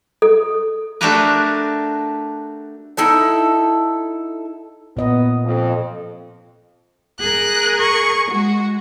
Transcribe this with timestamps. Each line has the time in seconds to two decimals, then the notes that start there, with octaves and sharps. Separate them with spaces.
0.22 A4
1.01 A3 D4 F#4 G4 A#4 B4
2.97 D#4 E4 A4 F#5
4.97 A#2 B3 D#5
5.44 F2
7.20 G#4 A#4 F#6
7.80 C#6
8.31 G#3 F#4